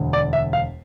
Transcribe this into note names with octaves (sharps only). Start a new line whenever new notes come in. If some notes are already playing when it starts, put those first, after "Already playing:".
Already playing: E1 D2 D3
D5
E5
F5